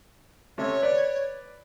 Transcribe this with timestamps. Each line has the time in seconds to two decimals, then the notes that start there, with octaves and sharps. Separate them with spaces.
0.58 C3 A3 C#4 C#5
0.82 B4 D5